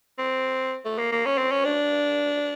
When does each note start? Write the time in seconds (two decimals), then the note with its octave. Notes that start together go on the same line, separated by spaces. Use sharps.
0.19 C4
0.85 A3
0.98 A#3
1.12 A#3
1.26 C#4
1.38 C4
1.52 C#4
1.65 D4